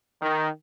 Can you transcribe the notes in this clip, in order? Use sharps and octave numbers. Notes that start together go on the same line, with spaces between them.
D#3